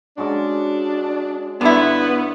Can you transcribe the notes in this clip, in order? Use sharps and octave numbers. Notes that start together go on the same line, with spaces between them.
G#3 C#4 D4 F#4
G2 D3 B3 E4